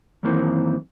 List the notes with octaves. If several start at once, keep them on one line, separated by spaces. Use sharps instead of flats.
F#2 D#3 E3 A#3 C4